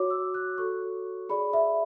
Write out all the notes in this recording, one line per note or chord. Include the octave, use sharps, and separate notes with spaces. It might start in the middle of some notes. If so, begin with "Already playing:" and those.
Already playing: F#4 C#5 D6
E6
F#6
F#4 A4 C#5 C#6
G#4 D5 B5
E5